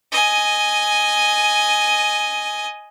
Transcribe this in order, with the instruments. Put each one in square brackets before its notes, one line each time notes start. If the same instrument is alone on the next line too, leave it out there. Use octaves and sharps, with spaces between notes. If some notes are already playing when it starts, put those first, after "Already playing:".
[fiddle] D#5 G#5